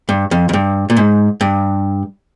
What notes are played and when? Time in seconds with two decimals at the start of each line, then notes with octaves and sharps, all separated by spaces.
0.09 G2
0.31 F2
0.49 F2
0.53 G2
0.90 A#2
0.97 G#2
1.41 G2